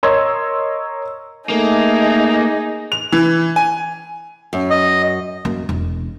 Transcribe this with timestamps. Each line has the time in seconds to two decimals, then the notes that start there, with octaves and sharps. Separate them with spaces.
0.03 A#4 C#5 D#5 C6 E6 G#6
1.50 A3 A#3 D#4 G#4
2.92 F7
3.12 E3
3.56 G#5
4.53 F#2
4.70 D#5
5.45 F#2 A#3
5.69 E1